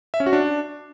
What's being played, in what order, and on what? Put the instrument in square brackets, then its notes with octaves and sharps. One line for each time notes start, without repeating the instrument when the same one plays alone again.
[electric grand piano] E5
C#4
F#4
D4